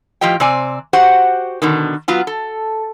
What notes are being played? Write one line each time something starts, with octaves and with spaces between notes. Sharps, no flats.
A2 F3 F4 G4 D#5 G5
C3 C4 D5 G#5
F#4 G4 C5 F#5
B2 D3 D#3
F#3 B3 F4 F#4
A4